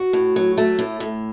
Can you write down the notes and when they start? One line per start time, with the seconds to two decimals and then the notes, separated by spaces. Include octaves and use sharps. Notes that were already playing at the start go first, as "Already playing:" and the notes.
Already playing: F#4
0.13 A2
0.36 F#3
0.57 A3
0.79 A2
1.00 A2